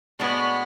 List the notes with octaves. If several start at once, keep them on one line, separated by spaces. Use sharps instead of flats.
A2 G#3 B3 D4 F#4